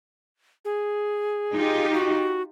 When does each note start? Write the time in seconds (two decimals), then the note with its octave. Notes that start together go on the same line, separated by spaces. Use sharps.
0.65 G#4
1.52 D#4 F4 G4
1.93 F#4